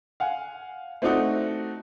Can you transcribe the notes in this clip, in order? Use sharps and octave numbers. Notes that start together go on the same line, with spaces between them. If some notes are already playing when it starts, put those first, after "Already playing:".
F5 F#5 G#5
A3 C4 D4 D#4 F#4 A4